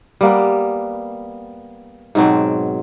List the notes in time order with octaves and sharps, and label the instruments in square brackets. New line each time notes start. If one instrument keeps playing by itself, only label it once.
[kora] G3 A#3 B3
G#2 B2 F#3 C4